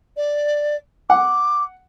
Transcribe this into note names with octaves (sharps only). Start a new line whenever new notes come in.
D5
F#5 D6